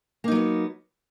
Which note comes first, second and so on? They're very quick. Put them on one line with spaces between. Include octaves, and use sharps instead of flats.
A#3 D#4 F#3 B3